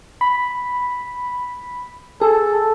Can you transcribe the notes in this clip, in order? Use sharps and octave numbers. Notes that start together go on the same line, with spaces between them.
B5
G#4 A4